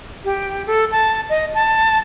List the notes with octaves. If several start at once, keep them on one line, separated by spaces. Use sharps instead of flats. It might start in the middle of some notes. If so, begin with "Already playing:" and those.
G4
A4
A5
D#5
A5